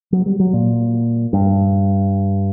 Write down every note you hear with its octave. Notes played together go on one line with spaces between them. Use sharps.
F#3
G3
F#3
A#2
G2